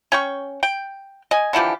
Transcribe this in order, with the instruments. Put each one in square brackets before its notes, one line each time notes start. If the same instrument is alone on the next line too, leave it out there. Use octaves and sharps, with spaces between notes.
[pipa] C#4 G5 C#6
G5
D#5 G#5
D3 E3 F3 G4